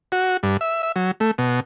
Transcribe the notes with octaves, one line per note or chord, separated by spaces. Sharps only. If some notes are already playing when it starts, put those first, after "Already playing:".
F#4
G2
E5
E5
F#3
A3
B2